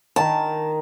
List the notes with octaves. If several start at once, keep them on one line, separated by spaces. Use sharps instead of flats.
D#3 A#4 A5